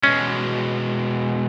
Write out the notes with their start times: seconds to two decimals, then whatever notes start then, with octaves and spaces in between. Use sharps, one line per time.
0.03 B2 G#3 C#4